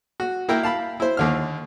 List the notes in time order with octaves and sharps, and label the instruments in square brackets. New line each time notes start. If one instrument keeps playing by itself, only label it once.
[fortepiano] F#4
A#3 E4 A#4 G5
F5 A5 B5
E4 C5
D#2 D3 F6